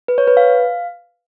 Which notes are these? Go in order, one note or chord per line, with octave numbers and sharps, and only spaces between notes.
B4
C#5
B4
F5